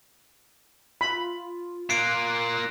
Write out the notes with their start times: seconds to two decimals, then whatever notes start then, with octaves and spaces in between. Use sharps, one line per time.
1.01 F4 B5
1.90 A#3 F4 F#6 C7 D7